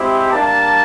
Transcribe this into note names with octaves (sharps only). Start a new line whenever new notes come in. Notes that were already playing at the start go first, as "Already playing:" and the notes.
Already playing: G#3 C4 E4 G4
G3 A#3 D4 A5